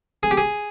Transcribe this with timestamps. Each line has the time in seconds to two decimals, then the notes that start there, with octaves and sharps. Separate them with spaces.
0.23 G#4
0.31 G4
0.37 G#4